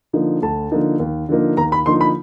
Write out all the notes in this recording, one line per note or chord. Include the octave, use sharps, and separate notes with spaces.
D3 F3 A#3 D#4
D2 A5
D3 F3 A#3 D#4
D#2
D3 F3 A#3 D#4
D#2 A#5
B5
D3 F3 A#3 D#4 C6
B5